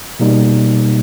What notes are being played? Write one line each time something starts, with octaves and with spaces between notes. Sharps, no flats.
B2 G3 A#3 D#4